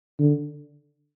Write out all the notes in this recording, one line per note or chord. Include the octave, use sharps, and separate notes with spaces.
D3